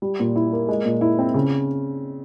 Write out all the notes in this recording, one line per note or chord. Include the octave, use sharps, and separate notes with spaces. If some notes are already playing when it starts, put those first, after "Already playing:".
G3
A#2
E4
A#3
G#3
A#2
E4
C4
C#3